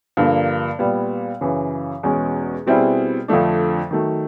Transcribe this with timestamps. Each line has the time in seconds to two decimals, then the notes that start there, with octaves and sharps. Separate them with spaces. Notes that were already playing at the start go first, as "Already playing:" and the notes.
0.17 G2 D3 F3 A#3
0.79 A#2 G3 B3
1.41 F#2 C#3 E3
2.03 E2 B2 G#3 C#4
2.67 B2 G3 C4 E4 G#4
3.28 F2 D3 F3 A3 D4
3.91 D#3 F#3 A3